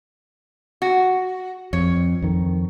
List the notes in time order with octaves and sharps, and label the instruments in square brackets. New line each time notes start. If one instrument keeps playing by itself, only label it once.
[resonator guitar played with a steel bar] F#4
[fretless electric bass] F2 [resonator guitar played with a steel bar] C#5
[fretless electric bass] F2 D#3